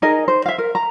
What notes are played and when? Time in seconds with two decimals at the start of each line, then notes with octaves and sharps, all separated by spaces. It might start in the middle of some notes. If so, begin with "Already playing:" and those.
0.02 D#4 G#4 A#4 D#5
0.28 C5
0.46 E5 F5
0.58 A#4
0.75 A#5